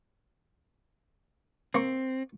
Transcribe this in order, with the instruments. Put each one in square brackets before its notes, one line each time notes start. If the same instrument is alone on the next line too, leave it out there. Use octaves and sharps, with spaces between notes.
[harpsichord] A#3 A#5 C#6 [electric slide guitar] C4